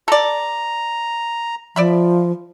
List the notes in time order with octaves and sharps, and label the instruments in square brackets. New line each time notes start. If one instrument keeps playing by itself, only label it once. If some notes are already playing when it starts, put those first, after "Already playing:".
[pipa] A4 D5 [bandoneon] A#5
[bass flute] F3 [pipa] D5 E5 B5